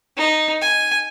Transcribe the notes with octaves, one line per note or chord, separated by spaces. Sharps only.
D#4
G#5